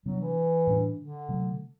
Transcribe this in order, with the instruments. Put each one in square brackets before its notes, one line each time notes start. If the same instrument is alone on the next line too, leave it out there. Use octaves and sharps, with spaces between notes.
[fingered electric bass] C3 G3 B3 D4 [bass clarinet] F#3
[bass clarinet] E3
[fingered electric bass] A2 G3 B3 D4
[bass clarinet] D3
[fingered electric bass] C3 F#3 A3